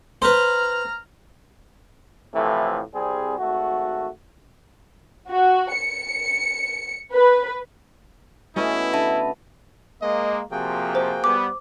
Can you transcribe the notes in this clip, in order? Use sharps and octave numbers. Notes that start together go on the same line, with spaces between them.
B4 C5 A#5 F6
A2 C3 E3 F3 A3
C2 G3 C4 G#4
G#1 A3 F#4
F#4
C#7
B4
E3 A3 B3 C#4 E4 F#4 D#5
D3 E5 A5 B5
G#3 A#3 D#5
C3 F3 A#3 F#4 G#4 G5
C5
G3 B3 D6